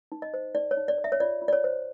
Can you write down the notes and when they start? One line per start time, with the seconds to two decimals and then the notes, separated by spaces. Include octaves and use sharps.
0.12 D#4
0.22 D#5
0.34 C5
0.55 D#4 D5
0.71 C#5
0.77 D#4
0.88 D5
0.98 C#5
1.04 E5
1.12 C#5
1.20 F4 D5
1.42 F4
1.48 D5
1.53 C#5
1.64 C5